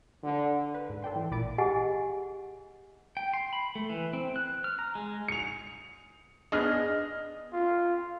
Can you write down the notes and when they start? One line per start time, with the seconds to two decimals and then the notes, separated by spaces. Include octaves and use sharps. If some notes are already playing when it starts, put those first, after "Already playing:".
0.24 D3
0.74 B4
0.90 G#2
1.02 A4 D5 G5 C6
1.16 E3
1.31 A1 A#2 D5 B5 A6 D7
1.58 G4 G#4 D#5 F#5 G#5
3.17 G5
3.33 C6
3.53 B5
3.75 A3
3.90 E3
4.13 C4
4.36 F#6
4.64 F6
4.79 A#5
4.95 G#3
5.28 C#7 F7
6.52 B3 D4 G#4 D#5 F6
7.52 F4